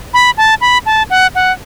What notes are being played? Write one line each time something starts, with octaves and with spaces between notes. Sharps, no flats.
B5
A5
B5
A5
F#5
F#5